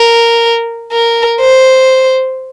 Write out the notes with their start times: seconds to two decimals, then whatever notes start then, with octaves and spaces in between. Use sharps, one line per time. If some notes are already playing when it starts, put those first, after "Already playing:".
Already playing: A#4
0.92 A#4
1.40 C5